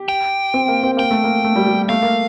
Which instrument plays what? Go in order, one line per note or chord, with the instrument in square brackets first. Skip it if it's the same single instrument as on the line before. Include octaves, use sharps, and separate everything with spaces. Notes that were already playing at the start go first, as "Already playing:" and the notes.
Already playing: [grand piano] G4
[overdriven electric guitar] G5
[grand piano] C4
A#3
C4
[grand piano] A#3 [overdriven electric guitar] G5
[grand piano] A3
A#3
A3
G3
G3
[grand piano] A3 [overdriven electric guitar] F5
[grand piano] A#3